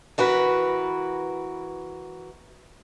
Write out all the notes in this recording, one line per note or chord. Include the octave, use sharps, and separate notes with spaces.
E3 F#4 A#4 B4